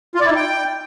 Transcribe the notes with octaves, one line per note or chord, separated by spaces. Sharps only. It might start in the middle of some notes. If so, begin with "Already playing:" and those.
F4
D5
E4
D#4
G5